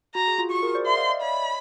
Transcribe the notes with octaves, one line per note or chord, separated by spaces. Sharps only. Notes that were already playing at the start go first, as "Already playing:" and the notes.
F#4 A#5
G#4
F4
F#4 C#6
G#4 A#4
C5 D5
D5 E5 C6
D#5 F5
D5 E5
C#5 D#5 B5